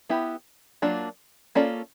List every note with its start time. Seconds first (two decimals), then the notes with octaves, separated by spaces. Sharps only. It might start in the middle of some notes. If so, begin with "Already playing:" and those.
0.09 B3 E4 G4
0.82 F#3 A#3 D4 F4
1.55 A#3 C#4 F4 A4 D5